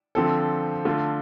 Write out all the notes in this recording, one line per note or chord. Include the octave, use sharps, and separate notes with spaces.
D3 F3 C4 A4
D3 A3 F4